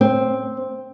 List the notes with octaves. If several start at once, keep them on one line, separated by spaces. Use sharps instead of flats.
C4